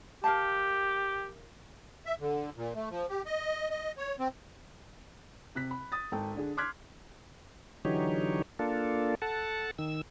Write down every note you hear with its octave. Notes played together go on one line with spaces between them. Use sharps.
G4 A#4 F5 A5
E5
D3
A#2
A3
F3
G4
D#5
D#5
C#5
C4
C3 F#6 B6
B5
D#6 A6
G#1 A4 G5
D3 D4 G#4
C6 D6 F6 F#6 G#6 B6
D3 E3 F#3 D#4 G4 C#5
A#3 D4 F4 A4
A4 F#5 A5
D#3 E6